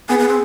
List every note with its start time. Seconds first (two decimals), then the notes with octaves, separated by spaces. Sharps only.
0.09 B3 G#4
0.19 B3
0.28 C4